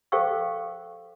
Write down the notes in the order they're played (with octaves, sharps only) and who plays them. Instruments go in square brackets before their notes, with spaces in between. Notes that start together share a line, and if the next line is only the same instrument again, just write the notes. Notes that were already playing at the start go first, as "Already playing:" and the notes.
[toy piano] A4 C5 F5 G5 C#6 E6